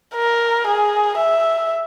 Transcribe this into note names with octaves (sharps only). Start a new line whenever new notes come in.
A#4
G#4
E5